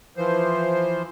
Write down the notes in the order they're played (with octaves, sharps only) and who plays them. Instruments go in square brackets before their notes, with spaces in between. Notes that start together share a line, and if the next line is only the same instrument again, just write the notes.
[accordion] E3 F3 C5